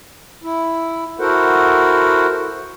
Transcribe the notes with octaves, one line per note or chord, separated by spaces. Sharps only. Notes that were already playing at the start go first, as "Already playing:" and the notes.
E4
E4 F#4 A4 A#4 C5 F#5